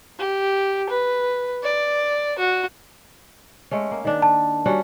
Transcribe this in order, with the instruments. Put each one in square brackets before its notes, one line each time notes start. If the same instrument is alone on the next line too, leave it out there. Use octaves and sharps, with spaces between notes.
[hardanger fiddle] G4
B4
D5
F#4
[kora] G#3 A3 C#4
A#3
D#3 D4
[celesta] A5
[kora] G3 C#4 F#4